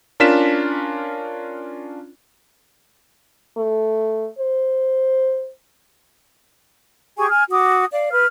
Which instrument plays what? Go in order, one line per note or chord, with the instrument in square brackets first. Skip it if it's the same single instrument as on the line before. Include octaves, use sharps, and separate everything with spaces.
[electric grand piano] C#4 D4 F4 A#4 B6 E7
[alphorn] A3
C5
[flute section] G4 G#4 G#5 C#6
G#5 F6
F#4 D6 D#6
D5 F5
B4 F6